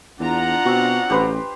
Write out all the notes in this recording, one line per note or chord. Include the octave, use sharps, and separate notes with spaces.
E2 D4 F4 F#5 A#5
B2 C4 F#4
A1 G4 B4 C5